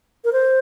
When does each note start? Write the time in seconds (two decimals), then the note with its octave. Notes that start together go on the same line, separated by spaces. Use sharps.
0.24 A#4
0.33 C5